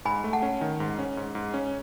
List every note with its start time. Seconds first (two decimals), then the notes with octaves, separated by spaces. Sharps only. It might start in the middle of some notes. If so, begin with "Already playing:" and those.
0.05 G#2 G#5 B5
0.24 A3
0.33 F#5 A5
0.42 C#4
0.61 D#3
0.80 G#2
0.98 C#4
1.17 G#2
1.35 G#2
1.54 C#4